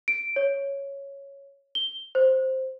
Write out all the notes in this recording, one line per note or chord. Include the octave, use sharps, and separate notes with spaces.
D7
C#5
G7
C5